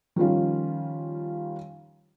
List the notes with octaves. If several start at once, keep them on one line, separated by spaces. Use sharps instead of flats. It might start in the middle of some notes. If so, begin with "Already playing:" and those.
D#3 F3 G3 C#4 F4